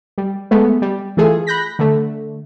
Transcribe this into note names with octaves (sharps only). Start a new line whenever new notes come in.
G3
G#3 A3 B3
G3
E3 A3 F4 G#4 A4
B5 F#6 G6 A#6 B6
D3 A3